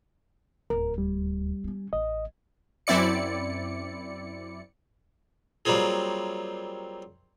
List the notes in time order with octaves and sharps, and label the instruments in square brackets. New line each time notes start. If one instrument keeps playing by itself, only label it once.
[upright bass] D1 D#2 [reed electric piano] A#4
[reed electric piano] G3
[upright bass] C4 C#4
[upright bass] A1 [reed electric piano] D#5
[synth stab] F#2 C4 E4 D5 C#7
[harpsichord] F#3 G3 A#3 C4 F4 G#4